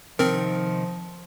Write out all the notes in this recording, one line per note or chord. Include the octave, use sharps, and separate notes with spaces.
C3 D#3 F3 C4 D#4 A#4